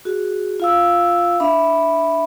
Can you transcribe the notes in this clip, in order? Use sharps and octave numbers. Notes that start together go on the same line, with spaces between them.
F#4 G#4
F4 F5 E6
D4 E5 B5